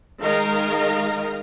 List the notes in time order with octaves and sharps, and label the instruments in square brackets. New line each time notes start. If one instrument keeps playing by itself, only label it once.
[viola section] D#3 G#3 A#4 D#5 F5 A#5